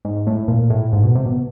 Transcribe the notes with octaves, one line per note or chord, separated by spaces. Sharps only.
G#2
A2
A#2
A2
G#2
B2
C3
B2